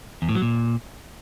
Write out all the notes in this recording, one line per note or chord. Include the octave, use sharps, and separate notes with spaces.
E2
A2
F#3
A#2